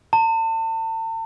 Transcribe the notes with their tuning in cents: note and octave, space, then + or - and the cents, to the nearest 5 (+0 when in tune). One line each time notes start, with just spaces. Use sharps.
A5 +40